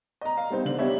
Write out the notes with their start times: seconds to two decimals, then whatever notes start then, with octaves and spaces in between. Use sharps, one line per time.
0.21 D#5 A#5
0.37 F5
0.50 G3 B3 C4 D#4 C5
0.65 D3 F#7
0.78 B3 D4 G4 C#5 D#5 E5